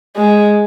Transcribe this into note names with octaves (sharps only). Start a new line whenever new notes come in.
G#3